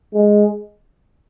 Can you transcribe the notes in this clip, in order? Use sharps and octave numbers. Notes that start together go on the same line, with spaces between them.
G#3